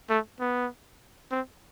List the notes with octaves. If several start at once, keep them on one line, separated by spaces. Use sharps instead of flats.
A3
B3
C4